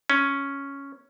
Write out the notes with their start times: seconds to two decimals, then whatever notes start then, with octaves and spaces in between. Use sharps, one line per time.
0.10 C#4